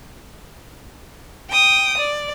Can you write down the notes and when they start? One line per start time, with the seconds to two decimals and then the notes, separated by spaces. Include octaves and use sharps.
1.50 G5 D#6
1.98 D5